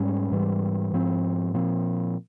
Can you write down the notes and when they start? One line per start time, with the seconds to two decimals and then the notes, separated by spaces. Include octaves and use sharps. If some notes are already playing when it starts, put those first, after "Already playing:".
Already playing: G#2 G3 C#4
0.32 G#2 E3 G3
0.93 G#2 F3 C4
1.54 A#2 F3 C4